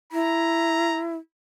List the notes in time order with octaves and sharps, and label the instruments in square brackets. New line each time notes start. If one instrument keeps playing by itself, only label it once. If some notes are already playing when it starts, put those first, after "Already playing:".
[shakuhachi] E4 [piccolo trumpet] A#5